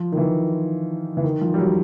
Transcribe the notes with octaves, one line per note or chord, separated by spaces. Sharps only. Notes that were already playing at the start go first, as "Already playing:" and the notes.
Already playing: F3
D#3
E3
E3
D#3
F3
G3
F#3